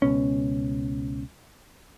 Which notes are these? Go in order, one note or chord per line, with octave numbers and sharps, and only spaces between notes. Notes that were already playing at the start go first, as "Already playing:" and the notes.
C#2 B2 C#4